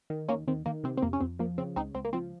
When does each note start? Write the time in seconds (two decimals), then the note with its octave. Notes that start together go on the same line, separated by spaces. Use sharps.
0.10 D#3
0.28 D#2 A#3 C#4
0.48 D#3 C4
0.66 D#3 A#3
0.84 C3 C4
0.97 C4
1.02 F2 A#3
1.13 C#4
1.21 F2 C4
1.39 F3 A#3
1.58 C#3 C4
1.76 C#2 C4 D#4
1.95 C#2 C4
2.05 A#3
2.13 F3 C4